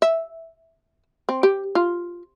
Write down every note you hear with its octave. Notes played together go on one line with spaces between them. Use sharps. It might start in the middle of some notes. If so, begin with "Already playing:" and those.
E5
C4
G4
F4